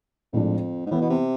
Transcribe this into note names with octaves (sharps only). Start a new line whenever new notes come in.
F2 A2 F3 G#3 D4 F4
G#2
A2 E3 B3 E4
B2
C3